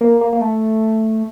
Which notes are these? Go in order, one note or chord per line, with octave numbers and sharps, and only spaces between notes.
A#3
A#3
A#3
A3